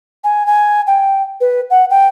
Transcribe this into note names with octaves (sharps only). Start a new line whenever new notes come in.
G#5
G#5
G5
B4
F#5
G5